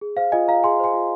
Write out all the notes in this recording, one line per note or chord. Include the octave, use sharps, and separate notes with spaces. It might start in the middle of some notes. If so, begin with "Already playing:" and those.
G#4
C5 F5
F4 D#5 G#5
F4 F5 A#5
G#4 G#5 C6
C5 G#5 C6
F4